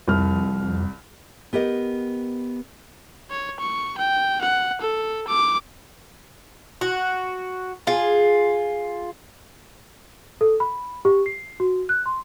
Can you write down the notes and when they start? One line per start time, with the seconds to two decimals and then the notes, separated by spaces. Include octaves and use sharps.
0.08 C2 F2 F6
1.53 B3 G4 A#4 D#5
3.31 C#5
3.60 C#6
3.98 G5
4.41 F#5
4.81 A4
5.28 D6
6.81 F#4
7.87 F4 G#4
10.41 A4
10.60 B5
11.05 G4
11.26 C7
11.60 F#4
11.89 F#6
12.06 C6